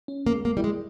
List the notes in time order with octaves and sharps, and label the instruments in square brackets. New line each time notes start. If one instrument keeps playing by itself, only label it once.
[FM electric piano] C#4
[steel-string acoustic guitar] A#3
[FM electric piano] G#3
[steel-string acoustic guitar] A#3
[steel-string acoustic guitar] G3 [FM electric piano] E4
[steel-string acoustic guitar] G#3